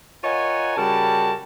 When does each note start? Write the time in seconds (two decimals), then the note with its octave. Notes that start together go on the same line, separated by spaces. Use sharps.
0.24 F4 A#4 C#5 D#5 F#5 G#5
0.76 C#3 G3 F#4 A#4 A5